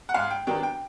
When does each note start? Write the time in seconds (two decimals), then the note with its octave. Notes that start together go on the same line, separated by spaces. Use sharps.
0.09 F#5
0.14 G#2 F5
0.30 G5
0.47 D#3 F#3 B3 D4 G5
0.63 G5